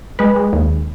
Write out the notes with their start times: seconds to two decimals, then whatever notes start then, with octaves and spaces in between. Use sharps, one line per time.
0.19 G#3 B4
0.36 G#3
0.53 D#2